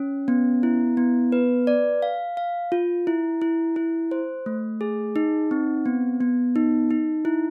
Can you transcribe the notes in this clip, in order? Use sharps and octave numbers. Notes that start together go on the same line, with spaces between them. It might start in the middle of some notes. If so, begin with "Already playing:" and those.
Already playing: C#4
B3
E4
B3
B4
D5
F5
F5
F4
E4
E4
E4
C5
A3
G#4
D#4
C4
B3
B3
D#4
D#4
E4